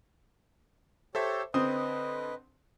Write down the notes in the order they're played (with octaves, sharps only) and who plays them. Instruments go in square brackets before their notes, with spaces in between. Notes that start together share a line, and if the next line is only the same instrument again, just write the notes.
[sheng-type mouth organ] G4 C#5 [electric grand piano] A4 C5 E5
[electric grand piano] D3 C6 D#6 [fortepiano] C4 [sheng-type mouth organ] B4 D#5